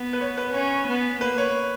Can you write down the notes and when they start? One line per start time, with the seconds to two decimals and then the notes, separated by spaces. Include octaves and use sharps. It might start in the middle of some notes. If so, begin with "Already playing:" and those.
Already playing: B3
0.13 B4
0.21 C#5
0.37 B4
0.54 C#4 C#5
0.88 B3
1.21 A#3 B4
1.38 C#5